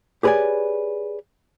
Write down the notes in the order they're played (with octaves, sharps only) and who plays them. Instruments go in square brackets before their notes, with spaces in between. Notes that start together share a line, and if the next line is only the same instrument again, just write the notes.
[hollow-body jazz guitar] G4 G#4 B4 C#5 D5 G#5